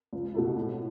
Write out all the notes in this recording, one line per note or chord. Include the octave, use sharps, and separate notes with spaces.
C#2
B2 A3 E4
A2